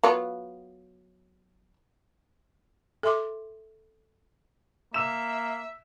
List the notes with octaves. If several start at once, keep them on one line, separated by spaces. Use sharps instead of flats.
F#3 B3 F4
A4 E5 C6 D6
A#3 E5 E6 E7